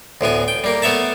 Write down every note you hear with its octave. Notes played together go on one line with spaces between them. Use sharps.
D2 A2 B3 G#5
G5
G3 A#3
A3 B3 C#5 E5 A5